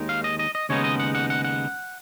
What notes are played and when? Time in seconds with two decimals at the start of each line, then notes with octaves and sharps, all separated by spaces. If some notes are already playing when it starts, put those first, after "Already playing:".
Already playing: D#2 D#3 G#3 D#4
0.09 F5
0.24 D#5
0.39 D#5
0.55 D#5
0.69 D#2 C#3 G#3 B3 D#4 C#5
0.84 D#5
1.00 F#5
1.15 F#5
1.30 F#5
1.44 F#5